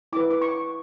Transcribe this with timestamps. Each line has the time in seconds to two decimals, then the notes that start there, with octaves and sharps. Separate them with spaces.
0.13 E4 B4 D6
0.31 D6
0.42 C#6